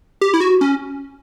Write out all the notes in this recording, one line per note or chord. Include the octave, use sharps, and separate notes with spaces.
G4
E4
F#4
C#4